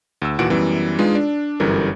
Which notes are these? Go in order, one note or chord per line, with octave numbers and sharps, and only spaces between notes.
D2 E6
D#2 A#2 E3 F#4 F#5 D7
F#2 E3 G3 B3
G#3 D4 D#4 F4 G#4 B4
D4
G1 F#2 E3 G3 A4 A#4